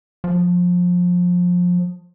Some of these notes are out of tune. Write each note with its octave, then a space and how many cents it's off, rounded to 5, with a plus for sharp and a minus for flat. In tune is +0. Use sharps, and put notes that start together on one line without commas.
F3 +25